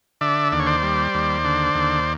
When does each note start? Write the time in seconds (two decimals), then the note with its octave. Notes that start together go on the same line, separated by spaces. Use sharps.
0.21 D3 D5 E5
0.52 D#2 D5
0.60 C#5
0.66 C5 D5
0.83 G3
1.14 D#2
1.45 D3
1.75 D#2